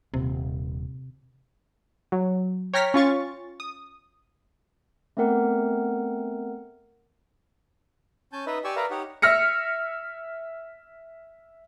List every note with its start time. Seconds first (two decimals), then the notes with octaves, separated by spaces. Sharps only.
0.14 D#1 C3
2.12 F#3
2.74 C#5 G5 A#5 F6 A#6 B6
2.94 C#4 F4 C#6 A6
3.60 D#6
5.17 A3 B3 C4 A#4 F#5
8.33 C#4 G#5 A5 G6
8.47 D#4 B4 D#5 E5
8.64 G4 D5 G#5 C#6 E6
8.76 A#4 B4 D5 E5 F5 A#5
8.90 D#4 G4 C#5 F#5
9.22 E5 F6 A#6 C#7